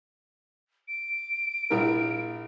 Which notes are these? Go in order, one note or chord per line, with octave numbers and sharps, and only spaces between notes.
D7
A#1 E4 A#4